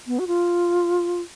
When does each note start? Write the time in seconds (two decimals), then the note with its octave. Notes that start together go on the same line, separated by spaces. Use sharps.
0.07 B3
0.19 F#4
0.27 F4